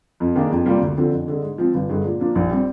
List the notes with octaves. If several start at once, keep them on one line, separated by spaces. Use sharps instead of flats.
F2
D#3 A#3 D4 G#4
F2
C3 G3 A#3 F4
D2
D3 F3 C4
F2
D3 G#3
G#2
F3 C4
G1
G2 D3 G#3
A#2
F3 A#3 D4
A#1
G3 C4